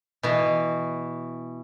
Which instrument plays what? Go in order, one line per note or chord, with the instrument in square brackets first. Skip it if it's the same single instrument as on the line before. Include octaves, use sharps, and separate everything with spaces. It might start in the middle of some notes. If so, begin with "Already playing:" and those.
[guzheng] B2 E3